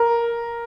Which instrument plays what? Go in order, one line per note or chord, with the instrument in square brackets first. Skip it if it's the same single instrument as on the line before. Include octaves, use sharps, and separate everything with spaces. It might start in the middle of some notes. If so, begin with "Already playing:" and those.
Already playing: [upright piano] A#4